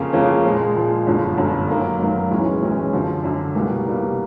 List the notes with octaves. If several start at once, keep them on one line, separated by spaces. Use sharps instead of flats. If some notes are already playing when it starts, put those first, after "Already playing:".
Already playing: F2 C#3 F3 A#3 C#4
F2 C#3 F3 A#3 C#4
A#2 F3 G#3
A#2 F3 G#3
G1 F#2 D3 F3
G1 F#2 D3 F3
F#2 D#3 F#3 A#3
F#2 D#3 F#3 A#3
B1 A2 E3 G#3 C#4
B1 A2 E3 G#3 C#4
F#2 D3 F3
F#2 D3 F3
C2 B2 G3 A#3
C2 B2 G3 A#3